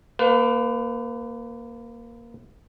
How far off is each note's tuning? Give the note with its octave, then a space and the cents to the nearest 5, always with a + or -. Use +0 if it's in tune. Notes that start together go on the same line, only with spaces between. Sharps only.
A#3 +0 B4 +40 F#5 -40